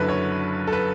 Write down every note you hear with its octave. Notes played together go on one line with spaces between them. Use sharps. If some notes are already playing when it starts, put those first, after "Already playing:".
Already playing: F#1 F#2 D3 A4 B4
C#5
A4
B4